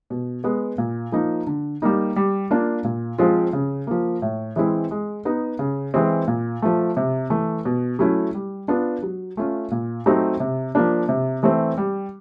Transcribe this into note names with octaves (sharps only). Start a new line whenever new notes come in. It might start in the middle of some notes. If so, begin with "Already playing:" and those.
B2
G#3 B3
A#2
F3 A#3 D#4
D3
G3 A#3 D#4
G3
A#3 D4 F4
A#2
F3 G#3 C4 F4
C#3
F3 A#3
A2
E3 G#3 C4 E4
G#3
B3 D#4
C#3
E3 G#3 C4
A#2
F3 A3
C3
E3 A3
B2
F#3 A3 C#4 E4
G3
B3 D4 F4
F#3
A3 C#4 F4
A#2
F#3 A3 C4 D#4
C3
F3 A#3 D4
C3
E3 A3 C4
G3